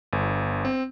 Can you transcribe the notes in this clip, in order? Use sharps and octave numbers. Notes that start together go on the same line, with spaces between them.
G1
C4